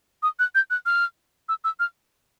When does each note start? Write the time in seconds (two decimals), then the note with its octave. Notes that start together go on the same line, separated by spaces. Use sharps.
0.23 D#6
0.39 F#6
0.55 G6
0.70 F#6
0.86 F6
1.49 E6
1.64 E6
1.80 F6